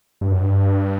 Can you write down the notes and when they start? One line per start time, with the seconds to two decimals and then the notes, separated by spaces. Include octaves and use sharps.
0.21 G2
0.31 F#2
0.40 G2